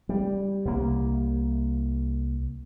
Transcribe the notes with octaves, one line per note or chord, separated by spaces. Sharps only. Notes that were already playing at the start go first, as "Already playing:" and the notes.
G3
C2 A#3